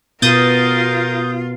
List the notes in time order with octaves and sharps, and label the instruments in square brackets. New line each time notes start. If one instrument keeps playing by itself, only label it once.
[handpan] B2 B3 [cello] F4 [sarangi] A#4 [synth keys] D#6 G6 A6